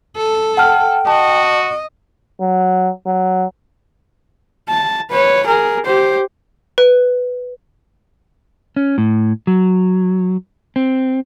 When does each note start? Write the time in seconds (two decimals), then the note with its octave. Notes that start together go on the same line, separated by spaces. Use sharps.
0.17 A4
0.57 F#5 G5 A5 F6
1.07 F#4 D#5 A5
2.41 F#3
3.06 F#3
4.69 A5
5.11 B4 C#5
5.46 G#4 A#4
5.85 G4 C5
6.78 B4
8.76 C#4
8.98 A2
9.47 F#3
10.76 C4